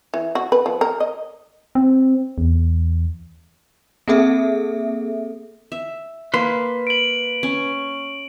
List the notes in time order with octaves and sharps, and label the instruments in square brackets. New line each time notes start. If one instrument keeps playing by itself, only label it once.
[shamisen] E3
F#4
B4
F3
A#4
D#5
[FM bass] C4
E2
[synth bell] A#3 C4 G#4 A4 E5
[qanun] E5
[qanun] A#3 [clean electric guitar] B4 C6
[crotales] D7 F#7
[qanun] C#4